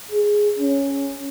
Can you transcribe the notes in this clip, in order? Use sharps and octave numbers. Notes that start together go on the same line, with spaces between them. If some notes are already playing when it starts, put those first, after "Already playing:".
G#4
C#4